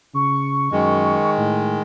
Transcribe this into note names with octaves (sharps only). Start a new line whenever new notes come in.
C#3 C#6
F#2 D#3 G#3
A2